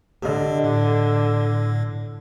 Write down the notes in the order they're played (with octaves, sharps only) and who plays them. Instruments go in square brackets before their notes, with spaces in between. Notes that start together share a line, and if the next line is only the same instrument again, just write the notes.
[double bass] D3 [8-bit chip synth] G4 D#5
[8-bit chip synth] A2